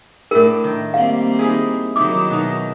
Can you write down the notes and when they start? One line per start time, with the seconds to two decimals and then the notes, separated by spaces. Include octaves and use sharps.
0.31 A2 D4 E4 A#4
0.64 D#3
0.94 G3 A#3 C4 F5
1.39 D#4 E4 G#4
1.96 D#3 F#3 D#4 E4 D6
2.30 B2 D#4 A#4